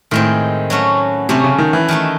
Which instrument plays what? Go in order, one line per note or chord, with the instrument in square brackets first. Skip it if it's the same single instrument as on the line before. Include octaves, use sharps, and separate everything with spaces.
[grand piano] A2 [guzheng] D#3 G#3 C4
[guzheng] F#3 A3 C#4 F#4
[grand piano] C3 [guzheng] F#3 A3 C#4 F#4
[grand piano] C#3
D#3
E3
[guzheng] D#3 A3 D#4